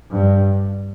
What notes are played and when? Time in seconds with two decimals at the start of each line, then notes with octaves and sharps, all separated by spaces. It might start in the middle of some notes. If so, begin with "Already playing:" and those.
0.11 G2